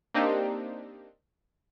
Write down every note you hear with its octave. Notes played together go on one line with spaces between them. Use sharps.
A#3 C4 D4 D#4 G4